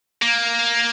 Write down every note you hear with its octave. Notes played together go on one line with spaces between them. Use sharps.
A#3